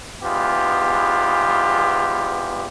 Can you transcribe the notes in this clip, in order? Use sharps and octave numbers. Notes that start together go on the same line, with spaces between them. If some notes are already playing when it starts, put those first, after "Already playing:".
E2 G#2 B3 F4 G4